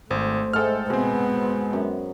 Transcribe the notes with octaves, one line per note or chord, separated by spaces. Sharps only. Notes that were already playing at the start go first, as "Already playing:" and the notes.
G#1 A3 C5
G#2 G#3 A4 G5 F6
B2 B3 C4 G#4
F#2